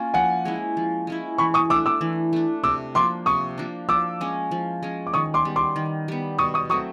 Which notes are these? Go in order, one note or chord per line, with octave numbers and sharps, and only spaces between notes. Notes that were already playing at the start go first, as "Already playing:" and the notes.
Already playing: A#3 C#4 F4
F3 F#5 G#5
G#3 C#4 E4
F3
G#3 C#4 E4
E3 B5 C#6
C#6 D#6
A3 D4 D6 E6
D6 E6
E3
A3 D4
C3 D6 E6
F3 A#3 D4 C6 D6
C3 C#6 D#6
F3 A#3 D4
F3 D6 E6
G#3 C#4
F3
G#3 C#4
D6
D#3 C#6 D#6
C6 D6
G3 B3
C6 D6
D#3
G3 B3
B2 C#6 D#6
C#6 D#6
F#3 A3 C4 C#6 D#6